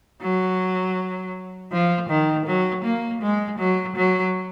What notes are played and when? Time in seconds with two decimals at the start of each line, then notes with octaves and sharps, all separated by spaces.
0.22 F#3
1.72 F3
2.10 D#3
2.46 F#3
2.84 A#3
3.22 G#3
3.59 F#3
3.96 F#3